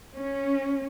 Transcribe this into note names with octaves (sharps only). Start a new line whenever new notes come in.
C#4